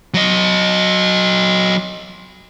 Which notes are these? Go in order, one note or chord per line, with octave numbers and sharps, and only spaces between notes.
F#3 D#5